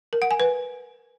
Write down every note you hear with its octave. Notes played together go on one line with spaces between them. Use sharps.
A#4
F#5
G#5
B4